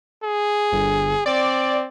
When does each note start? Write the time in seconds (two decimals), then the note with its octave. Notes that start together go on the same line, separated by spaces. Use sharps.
0.23 G#4
0.72 G1
1.26 C4 D5